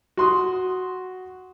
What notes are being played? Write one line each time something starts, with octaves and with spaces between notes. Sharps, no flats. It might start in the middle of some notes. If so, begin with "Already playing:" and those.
F#4 C6 D#6